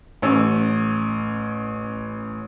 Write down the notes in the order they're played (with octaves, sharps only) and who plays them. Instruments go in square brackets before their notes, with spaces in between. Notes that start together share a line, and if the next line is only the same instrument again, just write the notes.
[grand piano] A1 C#4 E6